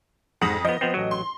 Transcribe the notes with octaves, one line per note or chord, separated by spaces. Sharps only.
F2 G#2 F#5 D#6 A#6
F3 B3 D#5
F3 B3 C4
A1 F#3
C6